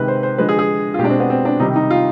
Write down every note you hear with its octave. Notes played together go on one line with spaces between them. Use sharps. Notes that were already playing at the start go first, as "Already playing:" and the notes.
Already playing: C3 D#3 G#3 B4
C5
C5
D3 F3 G#3 B4
G#4
G#4
F4
B2 G#3 D4 G4
C4
B3
C4
D4
C3 D#3 G3 D#4
D#4
F4